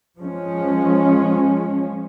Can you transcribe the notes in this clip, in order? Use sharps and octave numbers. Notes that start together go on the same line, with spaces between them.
F3 G#3 C#4